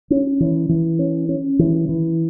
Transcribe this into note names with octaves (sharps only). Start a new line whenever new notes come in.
C#4
E3
E3
C#4
C#4
E3
E3